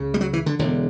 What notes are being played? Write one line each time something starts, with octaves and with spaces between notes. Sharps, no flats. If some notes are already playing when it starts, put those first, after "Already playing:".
Already playing: C#2 C#3
G3
F#3
E3
D3
E1 E2 D3